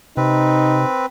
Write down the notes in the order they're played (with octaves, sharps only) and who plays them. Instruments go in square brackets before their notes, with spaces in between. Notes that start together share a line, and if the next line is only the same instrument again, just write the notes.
[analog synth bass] C3 [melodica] C4 B4 [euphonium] D#4